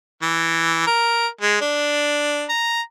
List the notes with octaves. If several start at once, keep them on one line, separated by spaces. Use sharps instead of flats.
E3
A#4
G#3
D4
A#5